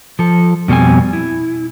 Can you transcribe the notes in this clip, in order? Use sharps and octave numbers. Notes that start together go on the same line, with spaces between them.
F3 A4
F2 B2 G3 C4 G#5
E4